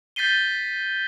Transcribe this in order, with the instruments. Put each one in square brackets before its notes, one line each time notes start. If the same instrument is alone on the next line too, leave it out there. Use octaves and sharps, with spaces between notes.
[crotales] G6 A6 B6 C7 D#7 G7